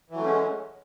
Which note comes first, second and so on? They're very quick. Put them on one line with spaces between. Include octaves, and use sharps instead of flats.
E3 F#3 A3 C#4 G#3